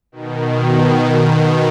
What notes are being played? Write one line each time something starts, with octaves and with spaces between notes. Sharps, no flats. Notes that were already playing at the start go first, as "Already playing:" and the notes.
B2 D#3